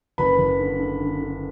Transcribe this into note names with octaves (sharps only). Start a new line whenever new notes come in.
F#1 B4 B5
F#1
D3
D3
D3
D3